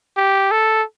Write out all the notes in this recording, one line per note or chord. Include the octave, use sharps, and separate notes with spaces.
G4
A4